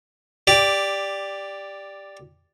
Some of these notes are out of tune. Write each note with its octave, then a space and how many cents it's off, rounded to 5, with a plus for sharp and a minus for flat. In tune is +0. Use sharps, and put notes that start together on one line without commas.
G4 +10 D5 +0